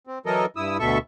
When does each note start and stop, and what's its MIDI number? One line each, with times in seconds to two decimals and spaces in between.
0.07 0.19 60
0.26 0.46 52
0.26 0.46 54
0.26 0.46 69
0.26 0.46 70
0.26 0.46 75
0.56 0.77 43
0.56 0.77 64
0.56 0.77 87
0.56 0.77 88
0.80 0.98 38
0.80 0.98 47
0.80 0.98 69
0.80 0.98 76
0.80 0.98 85